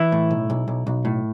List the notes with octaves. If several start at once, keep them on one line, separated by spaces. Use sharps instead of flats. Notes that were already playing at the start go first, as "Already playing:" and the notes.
Already playing: E3 E4
A2
B1
B1
B1
B1
A2